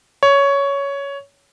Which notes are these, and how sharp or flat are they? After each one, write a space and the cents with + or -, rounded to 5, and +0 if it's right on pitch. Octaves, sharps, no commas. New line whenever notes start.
C#5 +10